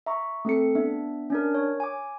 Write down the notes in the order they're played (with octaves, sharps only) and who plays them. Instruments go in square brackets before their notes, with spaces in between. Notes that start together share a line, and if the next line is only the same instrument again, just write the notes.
[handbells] E5 A#5 C#6
A3 C4 A4 C#7
B3 D4 E5
C#4 D4 A#4
C#5
G#5 D6